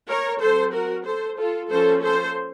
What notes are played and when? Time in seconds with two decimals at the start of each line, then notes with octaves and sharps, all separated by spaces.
0.09 A#4 C#5
0.41 F#3 C4 A4 C5
0.73 F#4 A#4
1.06 A4 C5
1.38 F4 A4
1.70 F3 A#3 C#4 A4 C5
2.03 A4 C5